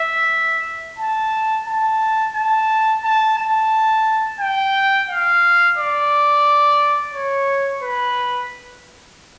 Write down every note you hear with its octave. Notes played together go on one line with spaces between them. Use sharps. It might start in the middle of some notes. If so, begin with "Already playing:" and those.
Already playing: E5
A5
A5
A5
A5
A5
G5
F5
D5
C#5
B4